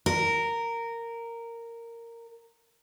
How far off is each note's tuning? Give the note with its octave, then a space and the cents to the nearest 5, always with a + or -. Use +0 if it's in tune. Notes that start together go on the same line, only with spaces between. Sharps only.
A#4 -10